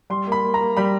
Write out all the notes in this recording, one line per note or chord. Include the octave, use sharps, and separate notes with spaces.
G3 C6
A#3 B5
A#3
A#5
A#3
G3 B5